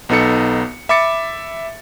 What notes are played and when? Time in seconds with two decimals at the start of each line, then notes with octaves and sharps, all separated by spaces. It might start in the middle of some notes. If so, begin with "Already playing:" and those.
0.09 B1 B3 D#4 A4 C#7
0.89 E5 B5 D6 A6 C#7